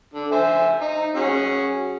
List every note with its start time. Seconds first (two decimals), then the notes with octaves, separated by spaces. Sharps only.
0.14 D3
0.32 C5 E5 G#5
0.81 D#4
1.15 C#4 F#4 G#4